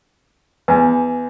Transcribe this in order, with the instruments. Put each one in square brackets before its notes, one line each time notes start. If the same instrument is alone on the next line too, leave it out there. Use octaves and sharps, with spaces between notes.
[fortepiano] E2 [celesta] B4 G#5